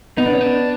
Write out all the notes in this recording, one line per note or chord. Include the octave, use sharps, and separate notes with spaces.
B3 D#4
D4
C#4
D4